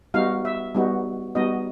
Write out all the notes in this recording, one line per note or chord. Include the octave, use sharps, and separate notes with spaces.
G3 B3 D#4 F#4 F5
E5
G3 B3 D#4 F#4
G3 B3 D#4 F#4 D#5